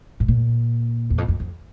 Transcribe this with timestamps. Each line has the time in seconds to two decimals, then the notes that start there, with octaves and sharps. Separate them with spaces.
0.20 A2
0.28 A#2
1.10 E2
1.18 F2
1.28 F2
1.40 F2